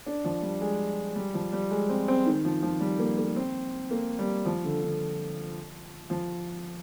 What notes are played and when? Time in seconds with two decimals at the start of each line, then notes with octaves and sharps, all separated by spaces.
0.06 D4
0.24 F3
0.42 G3
0.61 G#3
1.16 G3
1.34 F3
1.53 G3
1.71 G#3
1.89 C4
2.08 C4
2.26 D#3
2.45 F3
2.63 F3
2.81 G3
2.99 A#3
3.18 A#3
3.36 C4
3.91 A#3
4.19 G3
4.45 F3
4.64 D3
4.82 D3
6.10 F3